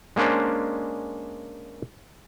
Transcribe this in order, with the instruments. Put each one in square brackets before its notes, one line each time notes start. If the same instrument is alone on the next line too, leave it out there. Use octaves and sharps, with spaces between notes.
[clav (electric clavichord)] G#3 A#3 C#4 D4 C5